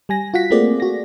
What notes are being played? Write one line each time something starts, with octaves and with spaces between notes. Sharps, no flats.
G3 G#5 A#6
F4 F#4 F#5 B6
A3 A#3 C4 F4 G#4 D5
F#4 A#6